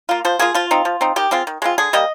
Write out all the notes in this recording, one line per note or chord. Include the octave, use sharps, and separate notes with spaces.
A#3 F4
F3 C5
A#3 F4 G#4
F3 F4
C4 D#4
F3
C4 D#4
D#3 G4
G#3 C4 F4
D#3
G#3 C4 F4
D3 G#4
G3 A#3 D#5